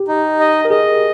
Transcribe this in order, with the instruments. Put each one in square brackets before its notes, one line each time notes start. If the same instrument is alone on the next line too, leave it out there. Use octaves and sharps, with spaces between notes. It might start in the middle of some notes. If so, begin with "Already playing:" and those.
Already playing: [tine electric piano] G4
[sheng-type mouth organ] D#4
D#5
[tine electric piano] A#4
[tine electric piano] G#4 [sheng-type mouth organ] D#5